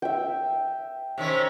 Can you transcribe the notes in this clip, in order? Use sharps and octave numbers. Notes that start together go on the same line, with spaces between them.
E5 G5
C3 D#3 C#4